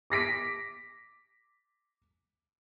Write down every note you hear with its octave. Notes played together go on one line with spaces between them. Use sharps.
D6 A#6 B6 D7